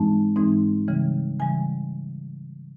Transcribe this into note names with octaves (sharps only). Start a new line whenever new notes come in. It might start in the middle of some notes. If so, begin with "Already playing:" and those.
Already playing: G#2 E3 G#3 C4 D#4 A5
G#2 E3 G#3 C4 D#4
C#3 E3 G3
C#3 E3 G3 G#5